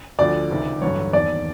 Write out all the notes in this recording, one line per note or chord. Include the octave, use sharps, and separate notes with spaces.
D2 D3 F3 D5
C#2 C3 D#3
A1 G2 D3 F#3 C#5
E1 D#2 D#3 D5